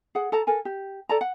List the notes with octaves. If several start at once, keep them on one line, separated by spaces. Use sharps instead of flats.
G#4 F#5
A4 A5 A#5
A4 A#4 G#5
G4
A4 D5 A5 A#5
F#5